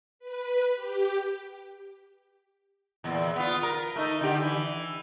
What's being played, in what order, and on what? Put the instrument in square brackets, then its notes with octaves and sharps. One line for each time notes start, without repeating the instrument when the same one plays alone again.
[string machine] B4
G4
[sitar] E2 A#2
B3 F4
A#4
A3 D#4
D3 G4
E3